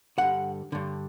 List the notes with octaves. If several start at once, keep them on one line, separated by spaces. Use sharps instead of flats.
G2 D3 F#5
G2 D3